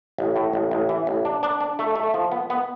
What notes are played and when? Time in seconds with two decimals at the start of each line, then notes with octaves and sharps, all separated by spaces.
0.18 A1
0.36 A2
0.53 A1
0.71 A1
0.89 E3
1.07 A1
1.25 D4
1.43 D4
1.61 D4
1.79 A3
1.96 A3
2.14 F3
2.32 B3
2.50 B3